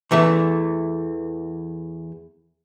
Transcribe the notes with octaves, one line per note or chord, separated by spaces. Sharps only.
E2 E3 A3 E5